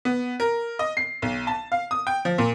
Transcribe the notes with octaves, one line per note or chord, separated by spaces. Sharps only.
B3
A#4
D#5
C7
B1
A5
F5
D#6
G5
F3
A#2